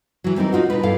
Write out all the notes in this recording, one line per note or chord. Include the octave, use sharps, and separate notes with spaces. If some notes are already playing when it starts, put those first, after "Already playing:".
E3 F#3
G3 C4 D#4 A#4
C#4 D#4 F4 F#4
B2 F4 B4
G2 E4 A4 F5